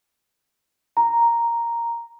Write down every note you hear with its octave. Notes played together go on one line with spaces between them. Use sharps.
A#5